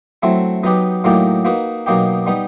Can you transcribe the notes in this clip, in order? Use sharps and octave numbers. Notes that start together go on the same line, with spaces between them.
F#3 A3 C4 E4
F#3 B3 D#4 G4 B4
A2 F#3 A#3 D#4 G4
A#3 D#4 F#4 B4
B2 F#3 A#3 D#4 G4
G3 B3 D#4